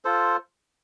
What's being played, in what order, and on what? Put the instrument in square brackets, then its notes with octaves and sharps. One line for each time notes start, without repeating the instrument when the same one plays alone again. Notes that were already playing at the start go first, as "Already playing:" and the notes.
[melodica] F4 A4 C5